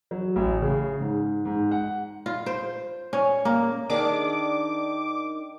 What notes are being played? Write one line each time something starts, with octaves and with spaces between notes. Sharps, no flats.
F#3
A1
C#3
G#2
G#2
F#5
F4
C5
C#4
A#3
D#3 D4 G#4 D6